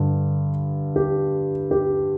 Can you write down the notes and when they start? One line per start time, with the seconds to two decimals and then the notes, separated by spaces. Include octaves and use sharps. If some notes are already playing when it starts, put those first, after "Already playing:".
Already playing: G2 D3
0.96 G4
1.71 G4